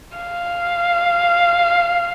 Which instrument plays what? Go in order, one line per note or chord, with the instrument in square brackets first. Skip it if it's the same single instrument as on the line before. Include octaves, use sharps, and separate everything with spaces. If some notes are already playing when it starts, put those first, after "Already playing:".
[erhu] F5